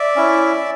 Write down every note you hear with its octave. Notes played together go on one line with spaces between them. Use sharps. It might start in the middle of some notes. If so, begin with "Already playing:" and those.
Already playing: D5 E5
C#4 E4